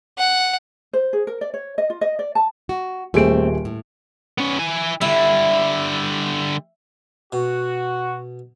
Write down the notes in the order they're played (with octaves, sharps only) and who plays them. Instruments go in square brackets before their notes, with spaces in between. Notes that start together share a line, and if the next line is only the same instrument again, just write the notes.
[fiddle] F#5
[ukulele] C5
G#4
A#4
D5
C#5
D#5
F4
D#5
D5
A5
[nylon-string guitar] F#4
[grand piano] D#1 G#4 D7 [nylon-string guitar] A3 C4
[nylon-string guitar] A2
[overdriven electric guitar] B3 C#4
E4 G#5
[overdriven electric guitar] D3 G3 [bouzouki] E4
[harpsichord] B2 [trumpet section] F#4